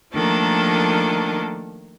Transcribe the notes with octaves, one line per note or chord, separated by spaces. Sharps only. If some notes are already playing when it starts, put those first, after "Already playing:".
D#3 F3 A3 A#3 D4 A4